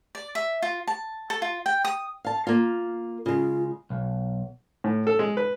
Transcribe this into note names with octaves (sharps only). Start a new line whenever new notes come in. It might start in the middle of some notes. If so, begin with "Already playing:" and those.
D5
E5
F4
A5
A4
F4
G5
D#6
F5 A5
A#3 F4
C#3 G#3 F4
B1
A2
A4
G#3
B4